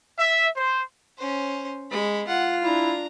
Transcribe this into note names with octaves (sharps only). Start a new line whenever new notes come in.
E5
C5
C#4 C5
G#3 B5
F4 F#5
D4 E4 A#5